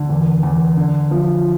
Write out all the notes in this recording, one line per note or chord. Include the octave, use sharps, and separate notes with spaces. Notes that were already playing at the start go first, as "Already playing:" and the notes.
Already playing: D2 D3
E2
E2
D3
F3